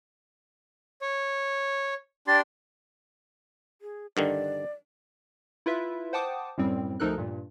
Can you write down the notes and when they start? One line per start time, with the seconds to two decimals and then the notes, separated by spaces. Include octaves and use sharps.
1.02 C#5
2.28 D4 G4 C6 A6
3.82 G#4
4.17 G2 D3 D#3 D5
5.66 E4 F4 B4 E5
6.13 C5 F#5 G5 A5 D6 D#6
6.58 F#2 A2 G3 C4
7.00 D2 F3 D#4 A4 A#4 F#6
7.18 G2 A#2